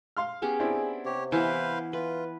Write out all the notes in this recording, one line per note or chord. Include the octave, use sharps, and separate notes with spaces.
F5 C6 F6
B3 C#4 G4 G#4
C4 D4 E4
C3 G4 C#5
E3 B3 B4 C5 F5 G#5
E3 F4 B4